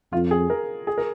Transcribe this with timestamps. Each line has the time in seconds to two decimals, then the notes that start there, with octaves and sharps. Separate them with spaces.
0.13 F2 F4
0.31 G#4
0.50 A#4
0.87 G#4
0.98 A#4